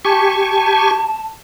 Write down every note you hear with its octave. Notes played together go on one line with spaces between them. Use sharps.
G4 G#5 A5 C#6